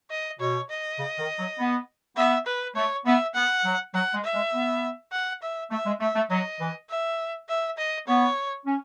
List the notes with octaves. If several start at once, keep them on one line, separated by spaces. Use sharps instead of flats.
D#5
B2 C#5
D#5
C#3
D#3
F#3
B3
B3 E5
B4
A3 C#5
B3 E5
B3 F#5
F#3
F#3 F#5
G#3
E5
G#3
B3
F#5
E5
A3 E5
G#3
A3 E5
A3
F#3 D#5
E3
E5
E5
D#5
B3 C#5
C#4